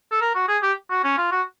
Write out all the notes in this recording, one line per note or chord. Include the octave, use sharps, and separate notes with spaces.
A4
A#4
F#4
G#4
G4
F#4
C#4
F4
F#4